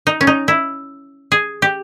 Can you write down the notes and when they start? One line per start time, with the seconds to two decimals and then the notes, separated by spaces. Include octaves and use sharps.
0.07 D#4
0.21 C#4
0.27 D#4
0.48 E4
1.32 G#4
1.62 G4